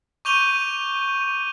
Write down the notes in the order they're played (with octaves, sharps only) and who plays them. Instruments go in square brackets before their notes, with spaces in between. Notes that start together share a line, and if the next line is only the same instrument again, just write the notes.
[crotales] C#6 D6 G6 D#7 F7 G7